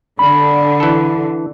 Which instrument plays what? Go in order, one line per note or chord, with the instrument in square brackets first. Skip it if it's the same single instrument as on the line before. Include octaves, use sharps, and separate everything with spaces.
[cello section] D3 [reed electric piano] B5
[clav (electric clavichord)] E3 A4